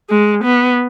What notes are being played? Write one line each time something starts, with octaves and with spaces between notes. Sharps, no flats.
G#3
B3